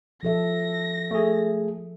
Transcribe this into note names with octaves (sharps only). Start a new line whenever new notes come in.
F3 A4 E5 A#6
A3 G#4